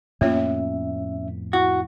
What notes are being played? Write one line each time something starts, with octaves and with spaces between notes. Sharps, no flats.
F2 A2 A#3 B3 C#4 F4 C#5 E5
E4 F#4